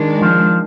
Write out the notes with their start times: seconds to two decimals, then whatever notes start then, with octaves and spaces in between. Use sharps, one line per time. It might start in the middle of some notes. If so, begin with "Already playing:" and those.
Already playing: D#3 G#3 D4
0.21 F3